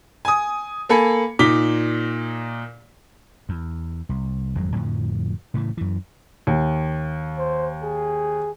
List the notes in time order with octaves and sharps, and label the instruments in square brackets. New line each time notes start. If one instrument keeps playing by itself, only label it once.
[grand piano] G#5 D#6
A#3 A4 G#5 B5 C#7
A#2 D#4 D6 B6 G7
[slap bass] E2
C2
G#1 F2 F#3 G#3
F2 A2 D3 F3
A2 C#3 E3
F#2 E3
[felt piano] D#2
[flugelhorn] C5
G#4